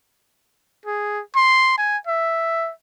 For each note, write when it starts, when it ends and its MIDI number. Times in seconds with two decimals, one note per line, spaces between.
0.86 1.21 68
1.36 1.73 84
1.78 1.97 80
2.07 2.72 76